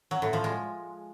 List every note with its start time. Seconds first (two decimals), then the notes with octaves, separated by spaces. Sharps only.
0.11 F#3
0.22 A2
0.33 F3
0.44 G#3